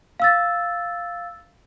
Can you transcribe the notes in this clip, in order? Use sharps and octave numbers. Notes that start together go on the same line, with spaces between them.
F5 E6 A6